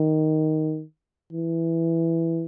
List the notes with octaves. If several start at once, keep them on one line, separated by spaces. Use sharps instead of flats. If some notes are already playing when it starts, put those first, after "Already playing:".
Already playing: D#3
E3